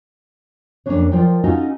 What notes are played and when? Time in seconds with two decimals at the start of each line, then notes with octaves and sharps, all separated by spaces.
0.86 F2 B2 A#3 C#4 D4 C#5
1.12 F3 F4 A#4 D5 G5
1.44 C#4 D#4 F4 F#4 A4 D#5